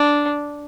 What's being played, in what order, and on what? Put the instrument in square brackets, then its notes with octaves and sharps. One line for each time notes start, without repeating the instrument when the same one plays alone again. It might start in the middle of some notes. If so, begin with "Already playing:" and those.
Already playing: [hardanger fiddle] D4